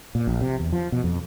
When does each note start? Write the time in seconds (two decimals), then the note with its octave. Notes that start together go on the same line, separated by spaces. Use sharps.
0.15 A#2
0.27 A#1
0.41 C3
0.60 E2
0.72 F3
0.92 B2
1.04 F2